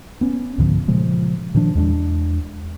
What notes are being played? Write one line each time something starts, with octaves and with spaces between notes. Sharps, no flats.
B3 C#4
C#2 G#2 D3 F3
A#2 C#3 F3 G#3
A#2 D#3 F3 D4
E2 G#3 C#4 D4